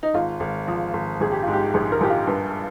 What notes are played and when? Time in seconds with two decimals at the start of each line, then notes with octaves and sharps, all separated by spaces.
0.03 D#4
0.14 G#1 F4
0.40 G#1
0.68 F3
0.94 G#1
1.20 A#1 G#4
1.32 G4
1.43 G#2 F4
1.53 G4
1.74 A#1 G#4
1.92 A#4
2.01 A#1 G4
2.10 F4
2.27 G2